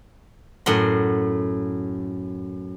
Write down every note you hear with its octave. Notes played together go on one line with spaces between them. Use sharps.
F#2 A2 F#5 C6